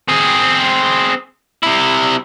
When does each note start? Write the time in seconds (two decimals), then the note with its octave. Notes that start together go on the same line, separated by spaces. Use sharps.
0.08 C4 G#4
1.63 C3 E4